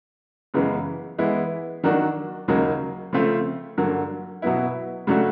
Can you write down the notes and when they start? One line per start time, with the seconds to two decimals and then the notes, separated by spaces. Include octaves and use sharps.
0.54 F#2 C#3 E3 G#3 B3
1.18 E3 G#3 B3 E4
1.84 D#3 F#3 A#3 D4 F#4
2.48 D#2 C#3 F#3 A#3 D#4
3.13 C#3 F3 A3 C4 F4
3.77 G2 D3 F#3 A#3
4.42 B2 F#3 B3 E4
5.07 C#3 F#3 A3 D4 F#4